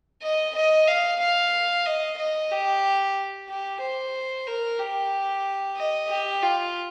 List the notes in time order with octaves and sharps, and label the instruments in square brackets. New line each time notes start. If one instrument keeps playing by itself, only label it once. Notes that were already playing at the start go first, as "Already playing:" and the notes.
[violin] D#5
D#5
F5
F5
D#5
D#5
G4
G4
C5
A#4
G4
D#5
G4
F4